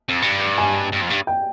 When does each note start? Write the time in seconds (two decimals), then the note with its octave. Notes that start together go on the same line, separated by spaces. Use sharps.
0.09 F2
0.22 G2
0.58 G#5
0.93 G2
1.02 F2
1.10 G2
1.27 G5